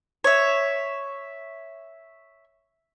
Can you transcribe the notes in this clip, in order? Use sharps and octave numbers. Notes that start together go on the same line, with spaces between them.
C#5 E5